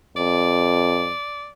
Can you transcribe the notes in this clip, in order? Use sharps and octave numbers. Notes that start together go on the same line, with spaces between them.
F2 D5